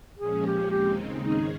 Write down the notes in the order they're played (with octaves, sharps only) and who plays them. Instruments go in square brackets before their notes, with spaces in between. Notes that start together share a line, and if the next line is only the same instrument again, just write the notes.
[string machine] A#2 F3 G#3 C#4 [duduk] G#4
[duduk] G4
[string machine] D#2 C#3 G#3 C4 D#4 [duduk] G4
[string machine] G#2 D#3 G#3 C#4 G#4 [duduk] D#4